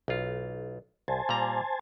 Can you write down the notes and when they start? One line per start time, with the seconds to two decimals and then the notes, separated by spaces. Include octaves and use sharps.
0.08 B1 F4
1.08 C2 C5 G#5 A5
1.29 A#2 G3 A#5